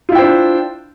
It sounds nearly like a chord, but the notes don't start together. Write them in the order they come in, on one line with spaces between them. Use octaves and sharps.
F4 E4 G5 C5 D4